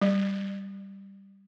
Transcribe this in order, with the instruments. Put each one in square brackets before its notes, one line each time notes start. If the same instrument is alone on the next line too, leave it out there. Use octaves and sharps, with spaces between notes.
[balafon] G3